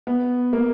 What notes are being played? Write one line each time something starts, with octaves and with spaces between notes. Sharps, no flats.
B3
A#3